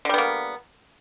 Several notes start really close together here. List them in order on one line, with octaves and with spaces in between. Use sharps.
D3 G3 B3 A#3